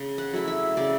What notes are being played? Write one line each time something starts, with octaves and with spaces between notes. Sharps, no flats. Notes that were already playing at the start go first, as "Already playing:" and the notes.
Already playing: C#3
F#5
F#3 A3 E4
E5
C#3 D5